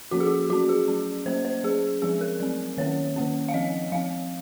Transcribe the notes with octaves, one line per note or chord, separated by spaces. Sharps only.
F3 A#3 C#4 F#4
G#4
F#4
F#3 C#4 F#4
G#4
F#3 C#4
F#3 A#3 C#4 C5
C5
F#3 C#4 G#4
F3 G#3 C4 G#4
A#4
F#3 C4
D#3 A#3 C#4 C#5
D#3 A#3 C#4
F5
F3 C4 D#5
F3 C4 F5